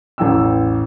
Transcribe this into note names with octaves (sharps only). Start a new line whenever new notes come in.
A1 E2 G5 A#5 E6